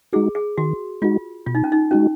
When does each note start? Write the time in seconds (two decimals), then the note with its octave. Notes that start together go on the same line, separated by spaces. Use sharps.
0.13 G#3 D#4 F#4 G#4
0.35 G#4
0.58 D#3 F#4
1.02 G#3 D#4 F4 F#4
1.46 B2 F4
1.55 D#4
1.64 C#4
1.72 D#4
1.91 G#3 C#4 D#4 F#4